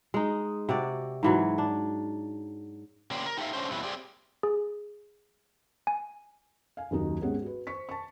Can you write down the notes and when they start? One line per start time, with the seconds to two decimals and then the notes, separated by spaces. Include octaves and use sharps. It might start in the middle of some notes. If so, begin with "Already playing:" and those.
0.14 G#3 D#4
0.69 C3 F#4 D5
1.23 G#2 E3 F#3
1.58 D4
3.11 C#3 A#3 G4 C5 D5
3.26 A#4
3.37 D#4 G4 A4 B4 E5 F5
3.53 D3 C#4 D4 C5
3.71 F2 B2 G3 A3 E4 B4
3.83 C4 G4 G#4 D5
4.43 G#4
5.87 G#5
6.77 F5 G#5
6.91 F#1 D#2 D#4 F#4
7.21 G#1 B3 C#4 G4 G#4 F#5
7.42 F#4 B4
7.67 C5 C#6 B6
7.89 A5 C#6